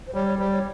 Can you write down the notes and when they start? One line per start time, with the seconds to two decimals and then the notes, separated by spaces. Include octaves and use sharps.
0.07 C5
0.14 G3 C#5
0.26 C#5
0.38 G3 C5
0.51 C#5